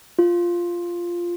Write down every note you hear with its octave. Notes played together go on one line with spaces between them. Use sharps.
F4